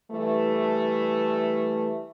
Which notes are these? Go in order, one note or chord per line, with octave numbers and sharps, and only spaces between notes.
E3 G3 A3